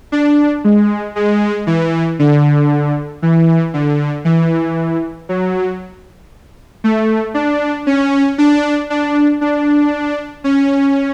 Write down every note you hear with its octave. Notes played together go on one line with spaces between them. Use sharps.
D4
G#3
G#3
E3
D3
E3
D3
E3
F#3
A3
D4
C#4
D4
D4
D4
C#4